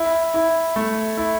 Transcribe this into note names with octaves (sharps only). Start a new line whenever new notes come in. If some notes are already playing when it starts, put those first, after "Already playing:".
Already playing: E4
E4
A3
E4